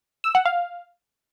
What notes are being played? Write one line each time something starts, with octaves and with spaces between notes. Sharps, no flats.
E6
F#5
F5